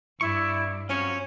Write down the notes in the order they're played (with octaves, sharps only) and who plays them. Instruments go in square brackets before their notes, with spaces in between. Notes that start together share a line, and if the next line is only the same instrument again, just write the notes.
[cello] G2 [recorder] E4 [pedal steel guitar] D5 E5 C#6
[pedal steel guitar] F#3 C4 F4 [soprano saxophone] C#4 [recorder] C#5